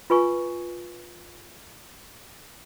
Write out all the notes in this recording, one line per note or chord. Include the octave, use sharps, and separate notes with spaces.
F4 B4 G#5 C#6